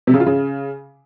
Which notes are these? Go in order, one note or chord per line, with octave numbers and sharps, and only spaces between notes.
C3
C#3
F4
C#3